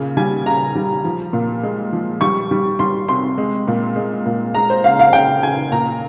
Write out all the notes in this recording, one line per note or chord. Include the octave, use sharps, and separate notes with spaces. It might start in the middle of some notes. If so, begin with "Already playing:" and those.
Already playing: A#2 C#3
G3 G#5
C#3 A#5
G3
F3
A#2
G#3
F3
G3 C#6
G3
G3 C6
C3 C6
G#3
A#2
G#3
A#2
G#3 A#5
C5
C#3 F5
F5
C#3 G5
C#3 G#5
A#2 A#5